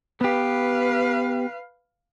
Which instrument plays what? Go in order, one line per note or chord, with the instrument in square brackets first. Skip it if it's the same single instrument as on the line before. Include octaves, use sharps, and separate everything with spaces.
[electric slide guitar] B3 G4 [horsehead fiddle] B4 F5